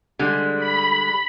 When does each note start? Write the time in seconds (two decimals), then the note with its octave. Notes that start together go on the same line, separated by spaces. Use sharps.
0.19 D3 G3 G#3
0.58 B5